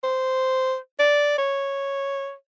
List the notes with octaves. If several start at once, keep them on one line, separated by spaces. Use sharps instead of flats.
C5
D5
C#5